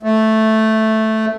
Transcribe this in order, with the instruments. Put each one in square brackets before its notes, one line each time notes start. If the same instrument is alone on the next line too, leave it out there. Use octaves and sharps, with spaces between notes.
[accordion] A3